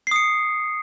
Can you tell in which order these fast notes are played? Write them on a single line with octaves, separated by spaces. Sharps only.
C7 D#6 C#7